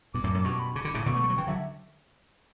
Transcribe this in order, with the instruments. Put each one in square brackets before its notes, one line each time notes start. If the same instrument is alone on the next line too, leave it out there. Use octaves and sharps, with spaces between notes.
[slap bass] G2 B2 [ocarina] D6
[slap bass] F#2 A2
F#2 A2
[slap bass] G2 B2 [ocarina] C#6
[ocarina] B5
[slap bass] C#3 [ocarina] D6
[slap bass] D3
A2 C#3
[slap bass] B2 D3 [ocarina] C#6
[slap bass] A3
G3
F#3
[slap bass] C#3 E3 [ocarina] G5
[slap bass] D3 F#3 [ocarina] E5